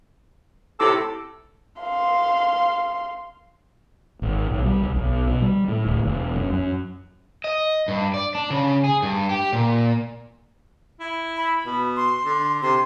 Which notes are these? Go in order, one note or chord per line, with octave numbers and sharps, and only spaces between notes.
A2 C3 E4 A4 D6 E6
F5 C6
G#1
B1
G3
C2
B1
B2
G3
A2
D1
E1
F#2
F#2
D#5
G2
D5
D4
C#3
G#4
G2
G4
A#2
E4
B5
B2
C6
D3
C3 C6